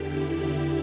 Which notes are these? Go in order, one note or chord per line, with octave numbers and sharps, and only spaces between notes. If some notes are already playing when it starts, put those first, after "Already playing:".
Already playing: E2 D3 E4 G4